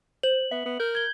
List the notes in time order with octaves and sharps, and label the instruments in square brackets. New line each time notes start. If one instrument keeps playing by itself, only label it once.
[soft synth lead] C5 [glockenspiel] F#7
[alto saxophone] B3 [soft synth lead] E5
[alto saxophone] B3
[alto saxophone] A#4 [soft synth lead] G6
[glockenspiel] G#6 G7